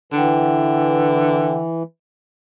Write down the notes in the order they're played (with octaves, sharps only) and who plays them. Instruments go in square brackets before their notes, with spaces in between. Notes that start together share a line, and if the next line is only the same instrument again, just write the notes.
[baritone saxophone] D3 [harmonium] E3 [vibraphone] F#5 G5